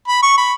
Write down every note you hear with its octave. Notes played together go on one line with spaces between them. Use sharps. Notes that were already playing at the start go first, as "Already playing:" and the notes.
B5
C#6
B5